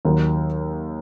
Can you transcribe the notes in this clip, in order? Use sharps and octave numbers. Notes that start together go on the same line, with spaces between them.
D#2 D#3 F#3